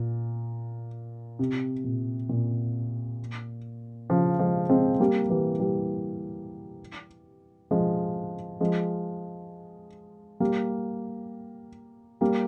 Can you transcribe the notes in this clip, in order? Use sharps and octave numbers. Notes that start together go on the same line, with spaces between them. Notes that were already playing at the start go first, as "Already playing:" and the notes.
Already playing: A#2
C3
A#2
A#2
C#3 F3
F3 G#3
G#3 C4
G3 A#3
E3 G3
E3 G3
F3 G#3
F3 G#3
G3 A#3
G3 A#3